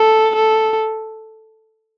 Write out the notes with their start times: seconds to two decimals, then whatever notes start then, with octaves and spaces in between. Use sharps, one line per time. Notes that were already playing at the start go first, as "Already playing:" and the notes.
Already playing: A4
0.36 A4